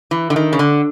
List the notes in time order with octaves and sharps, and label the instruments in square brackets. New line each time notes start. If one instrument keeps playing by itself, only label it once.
[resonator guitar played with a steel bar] E3
D3
D#3
C#3
D3